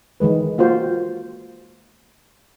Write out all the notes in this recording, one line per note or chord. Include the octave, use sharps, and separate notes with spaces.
D#3 E3 G#3 B4
A#3 F4 F#4 C5